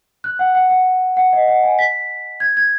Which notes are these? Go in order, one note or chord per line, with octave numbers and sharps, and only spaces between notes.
F#6
F#5
F#5
F#5
F#5
D#5
F#5
G#5
B6
G#6
G#6